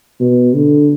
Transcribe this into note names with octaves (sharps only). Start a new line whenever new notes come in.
B2
D3